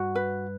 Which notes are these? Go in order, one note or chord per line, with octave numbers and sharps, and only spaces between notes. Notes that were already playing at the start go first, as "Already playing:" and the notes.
Already playing: G2 F#4
B4